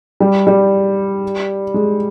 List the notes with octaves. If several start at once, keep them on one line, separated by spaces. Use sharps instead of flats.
G3
G3
G#3